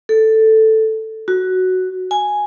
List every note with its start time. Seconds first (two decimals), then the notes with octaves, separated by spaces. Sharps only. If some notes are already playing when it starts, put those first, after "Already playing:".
0.09 A4
1.28 F#4
2.11 G#5